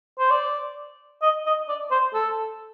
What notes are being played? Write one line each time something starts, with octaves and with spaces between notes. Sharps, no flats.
C5
D5
D#5
D#5
D5
C5
A4